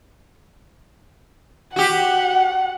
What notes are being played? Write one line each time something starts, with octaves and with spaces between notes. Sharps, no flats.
F#4 G4 F#5